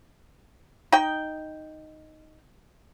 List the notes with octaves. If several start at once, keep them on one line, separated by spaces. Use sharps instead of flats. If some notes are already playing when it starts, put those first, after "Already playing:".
D#4 G5